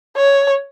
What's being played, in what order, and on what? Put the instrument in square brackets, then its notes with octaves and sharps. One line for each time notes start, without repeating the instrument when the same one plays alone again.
[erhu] C#5